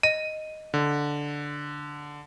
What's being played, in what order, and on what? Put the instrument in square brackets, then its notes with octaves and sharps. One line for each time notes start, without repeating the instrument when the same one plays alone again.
[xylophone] D#5 [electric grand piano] D#7
[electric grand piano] D3